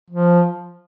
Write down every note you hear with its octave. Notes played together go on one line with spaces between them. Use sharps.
F3